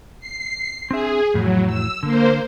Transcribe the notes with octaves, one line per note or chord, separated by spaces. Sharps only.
C7
C4 D4 G#4 E5
F2 A2 E3 F#3
E6
D3 A#3 C5